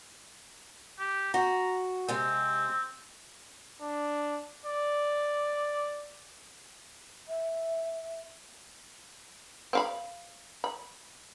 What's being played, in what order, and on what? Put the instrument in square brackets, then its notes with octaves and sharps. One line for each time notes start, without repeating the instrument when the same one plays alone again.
[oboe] G4
[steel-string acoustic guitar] F#4 [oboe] A#5
[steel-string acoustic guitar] C3 G#3 [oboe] C4
[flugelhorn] D4
D5
[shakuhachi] E5
[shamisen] C4 F5 B5
B5